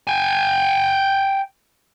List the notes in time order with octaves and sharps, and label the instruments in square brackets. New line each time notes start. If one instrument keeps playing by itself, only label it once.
[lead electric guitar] G5 G#5